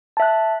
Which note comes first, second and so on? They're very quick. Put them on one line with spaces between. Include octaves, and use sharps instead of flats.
A5 E5 F#6